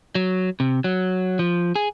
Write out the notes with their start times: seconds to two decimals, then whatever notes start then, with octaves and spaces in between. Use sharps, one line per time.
0.15 F#3
0.60 C3
0.84 F#3
1.39 F3
1.76 G#4